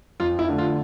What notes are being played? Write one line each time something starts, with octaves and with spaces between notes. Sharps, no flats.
F2 F4
E4
D3 A3 D4
F4